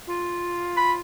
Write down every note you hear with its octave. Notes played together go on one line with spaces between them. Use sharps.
F4
B5